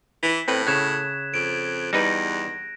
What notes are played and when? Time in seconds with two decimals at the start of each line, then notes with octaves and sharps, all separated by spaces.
0.23 E3 B6
0.48 A2 C4 B4
0.67 C#3 C#5 F#6 G#6 E7
1.34 F2 D7
1.93 E2 G3 D#4 B4 A#6